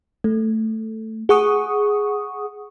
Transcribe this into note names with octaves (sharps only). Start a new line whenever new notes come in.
A3
G#4 F#5 C#6 D#6